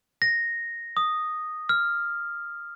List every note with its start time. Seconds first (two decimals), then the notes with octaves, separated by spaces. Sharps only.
0.22 A#6
0.97 D#6
1.69 F6